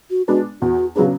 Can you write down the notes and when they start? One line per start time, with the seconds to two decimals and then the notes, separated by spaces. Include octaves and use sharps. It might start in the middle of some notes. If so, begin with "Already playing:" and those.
0.10 F#4
0.28 G#3 B3 D4 F#4
0.62 E2 F#4
0.95 C#3 F#3 B3 D4 G#4